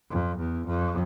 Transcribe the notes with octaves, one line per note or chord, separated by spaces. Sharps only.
F2
E2
F2